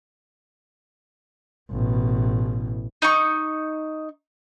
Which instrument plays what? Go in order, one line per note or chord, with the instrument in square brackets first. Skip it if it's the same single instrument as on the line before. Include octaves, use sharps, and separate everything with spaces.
[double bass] A1 B2
[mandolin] D#4 C#6